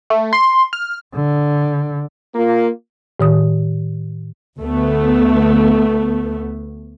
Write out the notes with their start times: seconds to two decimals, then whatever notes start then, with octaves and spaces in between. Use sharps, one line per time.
0.10 A3
0.33 C6
0.73 F6
1.15 D3
2.35 A#3 F4
3.20 A2 D#3 D#6
4.59 D2 A3 B3